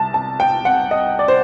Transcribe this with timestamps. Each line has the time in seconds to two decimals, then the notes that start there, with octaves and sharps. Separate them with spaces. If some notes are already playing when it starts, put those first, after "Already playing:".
Already playing: C2 A5
0.14 A5
0.40 G5
0.65 F#5
0.91 D#5
1.19 D5
1.28 C5